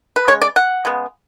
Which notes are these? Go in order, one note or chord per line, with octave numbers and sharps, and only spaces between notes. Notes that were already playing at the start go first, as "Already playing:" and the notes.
B4
C#3 G#3 C#5
D5
F#5
C#3 G#3 B3